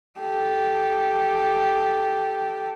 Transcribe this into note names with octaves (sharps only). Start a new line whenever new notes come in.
G4 A4